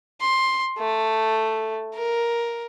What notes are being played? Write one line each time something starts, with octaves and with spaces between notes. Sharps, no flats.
C6
A3
A#4